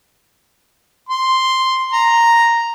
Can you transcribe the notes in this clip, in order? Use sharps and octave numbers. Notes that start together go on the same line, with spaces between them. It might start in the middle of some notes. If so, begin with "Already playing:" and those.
C6
A#5